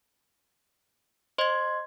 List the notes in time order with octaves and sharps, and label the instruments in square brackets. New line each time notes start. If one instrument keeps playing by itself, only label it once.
[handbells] C5 D#5 [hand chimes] C6 G#6